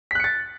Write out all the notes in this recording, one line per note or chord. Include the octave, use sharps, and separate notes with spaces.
F#6 A6 B6 C#7